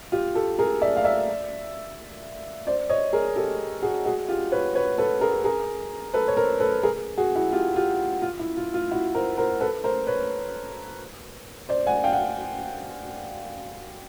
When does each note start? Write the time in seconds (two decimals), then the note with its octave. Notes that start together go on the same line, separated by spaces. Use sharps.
0.12 F4 G4
0.35 G4 A4
0.58 G#4 A#4
0.82 D5 E5
0.97 F5
1.04 D5 E5
2.67 C5 D5
2.89 C#5 D#5
3.13 G#4 A#4
3.36 G4 A4
3.82 F#4 G#4
4.05 F#4 G#4
4.29 F4 G4
4.52 B4 C#5
4.75 B4 C#5
4.98 A4 B4
5.21 G#4 A#4
5.44 G#4 A#4
6.14 A4 B4
6.28 C#5
6.37 A#4 C5
6.60 A4 B4
6.83 G#4 A#4
7.18 F#4 G#4
7.36 E4 F#4
7.52 F4 G4
7.76 F4 G4
8.22 F4
8.39 E4
8.57 F4
8.74 F4
8.91 E4 F#4
9.15 A#4 C5
9.37 A#4 C5
9.61 A4 B4
9.84 A#4 C5
10.07 B4 C#5
11.69 C5 D5
11.87 F#5 G#5
12.04 F5 G5
12.13 F#5